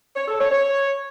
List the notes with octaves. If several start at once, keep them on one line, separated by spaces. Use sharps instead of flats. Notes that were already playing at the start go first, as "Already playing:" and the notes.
C#5
A4
C#5
C#5